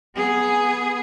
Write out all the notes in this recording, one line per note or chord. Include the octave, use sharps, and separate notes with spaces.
B3 G#4